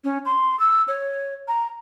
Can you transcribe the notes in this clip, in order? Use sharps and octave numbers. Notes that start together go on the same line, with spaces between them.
C#4
C6
E6
C#5
A#5